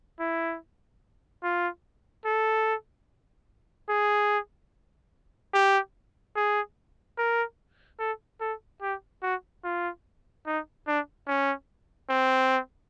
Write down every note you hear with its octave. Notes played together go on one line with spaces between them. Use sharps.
E4
F4
A4
G#4
G4
G#4
A#4
A4
A4
G4
F#4
F4
D#4
D4
C#4
C4